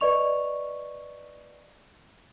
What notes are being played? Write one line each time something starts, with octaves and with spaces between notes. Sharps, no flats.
B4 D5 D#5 C#6 F7